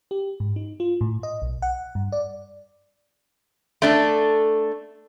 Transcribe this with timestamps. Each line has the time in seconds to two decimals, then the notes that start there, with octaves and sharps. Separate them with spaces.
0.11 G4
0.40 G#2
0.56 D#4
0.80 F4
1.01 A2
1.23 D#5
1.42 B1
1.62 F#5
1.95 G2
2.12 D5
3.82 A3 D4 A4